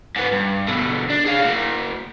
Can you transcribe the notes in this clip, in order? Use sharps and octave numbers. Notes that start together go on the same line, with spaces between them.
G#2 B3
G2
B2 D3
D4
G#4 F5
A#3 F#4